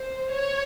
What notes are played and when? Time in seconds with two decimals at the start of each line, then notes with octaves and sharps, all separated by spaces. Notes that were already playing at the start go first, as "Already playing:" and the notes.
Already playing: C5
0.33 C#5